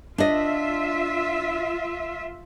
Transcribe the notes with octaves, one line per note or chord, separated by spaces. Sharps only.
D4 F4 D#5 E5